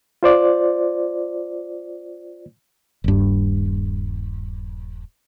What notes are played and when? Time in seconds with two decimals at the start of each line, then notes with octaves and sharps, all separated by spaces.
0.23 F4 C5 D5
3.04 D#1 G2